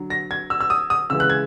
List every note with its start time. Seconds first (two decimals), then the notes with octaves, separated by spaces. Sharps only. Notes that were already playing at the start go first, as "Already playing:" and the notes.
Already playing: D3 F#3
0.10 A#6
0.31 G#6
0.50 E6
0.60 E6
0.70 D#6
0.90 D#6
1.10 C#3 E3 G#3 E6
1.20 F#6
1.30 G#6